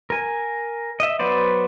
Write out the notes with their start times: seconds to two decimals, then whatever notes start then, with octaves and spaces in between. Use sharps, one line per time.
0.10 A#4 G#5
1.00 D#5 E5
1.19 F#3 B3 B4 C5 D5